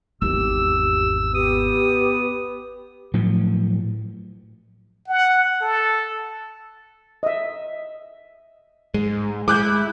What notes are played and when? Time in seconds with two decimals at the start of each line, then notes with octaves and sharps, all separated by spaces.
0.22 G#1 E2 G4 E6
1.35 B3 G4 D#6
3.14 A2 F3 F#3
5.08 F#5
5.62 A4
7.23 D#5 E5
8.94 G#2 G#3
9.48 G#3 E4 D6 F#6 G6